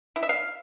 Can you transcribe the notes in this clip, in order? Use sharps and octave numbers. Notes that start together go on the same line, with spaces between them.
E4
E5
F5